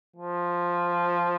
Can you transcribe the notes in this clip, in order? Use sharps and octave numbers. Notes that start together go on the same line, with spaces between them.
F3